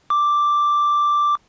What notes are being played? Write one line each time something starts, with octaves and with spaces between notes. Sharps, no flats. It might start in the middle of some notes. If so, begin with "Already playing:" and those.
D6